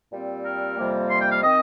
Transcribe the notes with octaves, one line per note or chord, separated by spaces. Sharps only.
A#2 G3 C4
A#4
F2 C3 G3 A#3
C6
G5
F5
D#3 C4 D#5